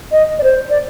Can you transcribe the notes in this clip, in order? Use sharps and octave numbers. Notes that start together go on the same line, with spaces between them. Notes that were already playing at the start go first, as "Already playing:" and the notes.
D#5
D5
C5
D5